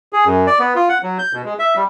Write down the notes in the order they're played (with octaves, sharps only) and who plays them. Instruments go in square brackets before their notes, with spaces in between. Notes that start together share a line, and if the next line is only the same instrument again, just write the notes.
[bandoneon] G#4
F#2
D5
B3
F4
F#5
F#3
G6
B2
G#3
E5
G3